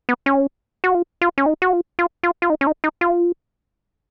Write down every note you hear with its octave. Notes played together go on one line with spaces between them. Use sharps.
B3
C#4
F#4
F4
F4
C#4
D#4
F#4
F4
F4
F4
F4
D#4
C#4
D#4
D#4
F4